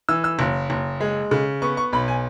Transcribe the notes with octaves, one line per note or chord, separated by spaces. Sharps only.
E3 E6
E6
F#1
F#1
G#3
C#3
B3 C#6
C#6
B1 B5
G#5